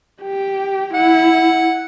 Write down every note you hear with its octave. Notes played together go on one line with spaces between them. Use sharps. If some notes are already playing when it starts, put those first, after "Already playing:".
G4
E4 F#5